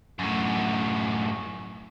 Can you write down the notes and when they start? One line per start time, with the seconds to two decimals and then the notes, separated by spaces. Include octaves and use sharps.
0.19 F#2 A2